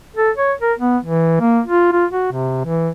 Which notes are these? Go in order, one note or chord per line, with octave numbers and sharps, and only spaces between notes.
A4
C#5
A#4
B3
E3
A#3
F4
F4
F#4
C3
E3